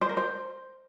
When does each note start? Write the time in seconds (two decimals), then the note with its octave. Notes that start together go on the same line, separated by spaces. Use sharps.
0.01 C5
0.09 A#4
0.17 C5